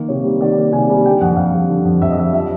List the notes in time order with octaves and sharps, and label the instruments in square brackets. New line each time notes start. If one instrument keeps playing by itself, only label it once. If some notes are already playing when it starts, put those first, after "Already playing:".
Already playing: [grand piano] D#3 A#3
C3 C#5
G3
D#3 D5
A#3
C3 G#5
G3
D3 G5
F2 F#5
F2 F5
G3
D3
F2
F2 E5
D#5
G3 E5
F3 E5